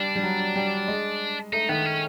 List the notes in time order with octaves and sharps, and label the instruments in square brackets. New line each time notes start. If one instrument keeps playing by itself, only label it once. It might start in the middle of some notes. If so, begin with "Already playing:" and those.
Already playing: [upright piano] G3 [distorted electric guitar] D4
[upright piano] G3
F#3
G3
G#3
[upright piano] A3 [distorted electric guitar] D#4
[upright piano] D#3 [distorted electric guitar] B3
[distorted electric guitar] C#4